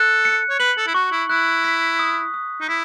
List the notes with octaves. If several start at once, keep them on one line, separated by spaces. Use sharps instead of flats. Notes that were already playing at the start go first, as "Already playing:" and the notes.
Already playing: A4 F#6
C#7
C#5
B4 F#7
A4
E4
F#4 C#6
E4
E4 F#6
B6
D#6
D#6
D#4
E4 B6